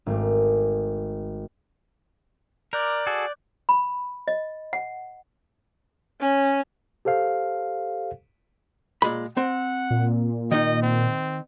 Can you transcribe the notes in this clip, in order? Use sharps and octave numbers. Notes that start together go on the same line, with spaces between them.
G#1 A3 D6
A#4 D5 D6 F#6 G6
F#4 G#4 A4
B5
D#5
F#5
C#4
G4 A4 C5 F5
A#2 G#3 B5
C4 F#5
A#2
D#3 D#4 D#5
C4